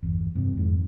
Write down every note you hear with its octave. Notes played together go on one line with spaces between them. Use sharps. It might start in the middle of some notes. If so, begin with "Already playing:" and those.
G1 E2
G2 C3 E3
F2 G#2 D#3 G#3